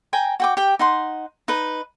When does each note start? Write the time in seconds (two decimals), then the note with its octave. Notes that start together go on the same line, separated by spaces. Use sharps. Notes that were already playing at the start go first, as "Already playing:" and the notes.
0.13 G5 G#5 A#5
0.40 F#4 G5 D6
0.57 G4 G5
0.79 D#4 F#5 C6
1.48 D#4 B4